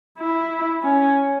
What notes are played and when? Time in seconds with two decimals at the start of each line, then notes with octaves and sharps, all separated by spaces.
0.19 E4
0.83 C#4